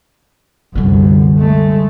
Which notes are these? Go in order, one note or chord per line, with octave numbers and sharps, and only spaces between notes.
C2 F#2 D3 G3
G#3 A3